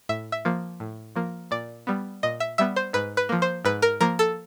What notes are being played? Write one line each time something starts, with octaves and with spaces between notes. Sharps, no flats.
A2 E5
E5
F3 A#3
A2
F3 A#3
A#2 D5
G3 B3
A#2 D#5
E5
G3 B3 E5
C5
G#2 B4
B4
F3 A#3
C5
G#2 B4
A#4
F3 A#3 A#4
A4